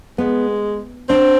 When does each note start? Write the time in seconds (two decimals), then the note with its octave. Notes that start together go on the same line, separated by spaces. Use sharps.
0.18 G#3 B3
1.09 C4 D4